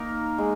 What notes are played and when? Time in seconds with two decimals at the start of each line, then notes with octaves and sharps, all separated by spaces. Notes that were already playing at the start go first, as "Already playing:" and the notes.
Already playing: A#3 D#4 A#4
0.38 G#3